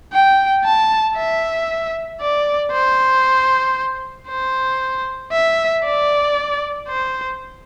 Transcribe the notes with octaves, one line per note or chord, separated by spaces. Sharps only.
G5
A5
E5
D5
C5
C5
E5
D5
C5